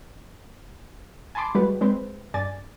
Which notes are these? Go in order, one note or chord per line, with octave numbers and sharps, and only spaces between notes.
G#5 A5 B5 C6 D6
G3 G#3 F#4 G4 B4
G#3 C4 B4 C5
G2 D5 G#5 A6